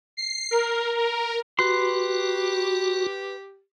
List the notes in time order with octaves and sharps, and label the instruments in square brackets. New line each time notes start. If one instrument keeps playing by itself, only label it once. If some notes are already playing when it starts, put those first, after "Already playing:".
[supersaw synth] C7
A#4
A#4
[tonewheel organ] F#4 [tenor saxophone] G4 [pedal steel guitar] B4 C6